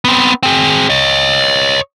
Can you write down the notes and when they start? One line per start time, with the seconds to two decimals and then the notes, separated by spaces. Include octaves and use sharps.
0.05 B3 C4
0.43 C4 G#4
0.90 C#5 D#5